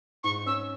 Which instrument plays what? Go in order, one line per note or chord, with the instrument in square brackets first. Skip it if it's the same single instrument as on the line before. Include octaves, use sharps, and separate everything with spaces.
[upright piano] G#2 [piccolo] C#6
[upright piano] C#4 [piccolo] E6